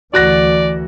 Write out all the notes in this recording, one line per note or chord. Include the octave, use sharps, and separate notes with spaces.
D2 E3 F#4 D5 F#6 A#6